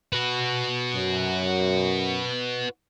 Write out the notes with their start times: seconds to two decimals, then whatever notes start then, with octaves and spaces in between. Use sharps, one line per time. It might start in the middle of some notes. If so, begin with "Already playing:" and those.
0.13 F#4 B4
0.95 F#2